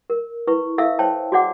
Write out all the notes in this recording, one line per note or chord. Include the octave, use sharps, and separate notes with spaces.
A#4
E4 B4 C#6
E4 A4 E5 F5 E6
C5 C#5 G5 A5
F#4 G#4 C#5 D5 F#5 D6